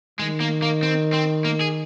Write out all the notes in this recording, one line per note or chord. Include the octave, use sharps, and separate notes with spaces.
D#3 G#3
A#3
A#3
C4
C4
A#3
G#4